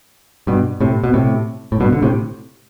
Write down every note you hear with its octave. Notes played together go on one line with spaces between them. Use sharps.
G2 B2
A2 C3
B2
A2 C3
A2
G2 B2
D3
A2 C3